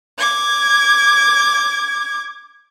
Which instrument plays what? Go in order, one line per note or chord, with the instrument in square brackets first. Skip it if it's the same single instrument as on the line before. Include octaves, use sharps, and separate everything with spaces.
[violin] D6 G#6